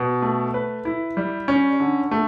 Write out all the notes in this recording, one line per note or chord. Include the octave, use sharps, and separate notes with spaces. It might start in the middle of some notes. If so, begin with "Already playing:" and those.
Already playing: B2
A3
B4
E4
G3
C#4
D3
A3